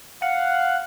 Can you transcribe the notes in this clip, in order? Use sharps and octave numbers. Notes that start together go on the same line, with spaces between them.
F5 F#5